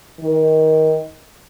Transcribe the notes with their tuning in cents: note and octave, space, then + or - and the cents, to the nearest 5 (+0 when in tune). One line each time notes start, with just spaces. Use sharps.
D#3 +20